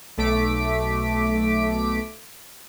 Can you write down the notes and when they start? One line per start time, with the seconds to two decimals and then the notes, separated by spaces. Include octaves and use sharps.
0.18 B1 A3 D6 B6 D7